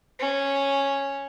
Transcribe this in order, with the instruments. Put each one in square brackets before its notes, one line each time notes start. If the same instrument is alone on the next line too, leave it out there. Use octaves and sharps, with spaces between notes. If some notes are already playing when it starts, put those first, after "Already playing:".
[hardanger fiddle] C#4